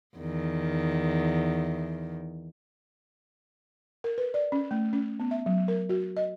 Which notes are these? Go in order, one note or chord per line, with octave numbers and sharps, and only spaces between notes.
E2 D#3
A#4
B4
D5
C#4
A3
C#4
B3
E5
F#3
A#4
F#4
D#5